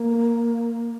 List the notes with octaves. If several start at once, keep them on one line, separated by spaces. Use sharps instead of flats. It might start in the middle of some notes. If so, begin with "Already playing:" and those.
Already playing: A#3